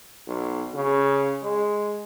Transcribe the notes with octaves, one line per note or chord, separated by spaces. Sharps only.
B1
C#3
G#3